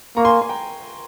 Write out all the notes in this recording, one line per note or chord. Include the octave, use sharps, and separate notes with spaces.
A#3 A#5 C#6
G#5 C6
G#5 C6
G5 A#5